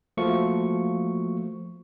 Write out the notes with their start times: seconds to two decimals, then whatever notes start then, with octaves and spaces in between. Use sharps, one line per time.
0.17 F3 A3 A#3 F#4 C#6